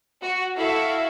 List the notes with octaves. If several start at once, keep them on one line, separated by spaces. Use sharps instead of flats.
F#4
E4 F#4 A4 E5 F5